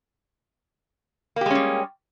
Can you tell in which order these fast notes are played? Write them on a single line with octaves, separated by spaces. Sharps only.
A#3 G4 G#3 C#4 G3